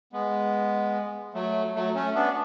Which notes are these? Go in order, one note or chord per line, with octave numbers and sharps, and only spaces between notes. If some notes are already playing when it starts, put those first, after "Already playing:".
G#3 B3
F#3 A3
F#3 A3
A3 C#4
B3 D4